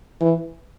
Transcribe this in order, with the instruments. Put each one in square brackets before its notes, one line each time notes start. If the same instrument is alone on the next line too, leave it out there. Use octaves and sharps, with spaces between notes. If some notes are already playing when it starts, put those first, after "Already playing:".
[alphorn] E3